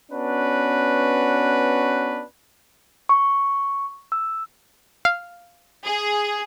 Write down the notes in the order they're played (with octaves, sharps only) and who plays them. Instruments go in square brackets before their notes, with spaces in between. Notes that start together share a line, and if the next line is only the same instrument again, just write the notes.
[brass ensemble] B3 C#4 D4 F#4 B4
[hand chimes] C#6
E6
[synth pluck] F5
[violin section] G#4